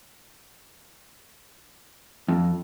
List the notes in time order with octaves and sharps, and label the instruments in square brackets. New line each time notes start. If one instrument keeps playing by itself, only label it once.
[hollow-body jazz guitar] F2